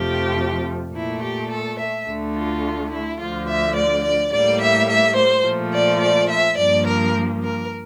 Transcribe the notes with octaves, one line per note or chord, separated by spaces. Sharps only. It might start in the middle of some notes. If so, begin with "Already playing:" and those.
Already playing: F2 C3 F3 A3 G4
A#2 A3 E4
G4
A4
E5
D2 D3 A3
F4
E4
D2 D3 F3 F4
E5
D5
D5
A2 G3 A#3 D5
E5
E5
C5
A#2 F3 A3
D5
D5
E5
G2 F3 A#3 D5
A#4
A#4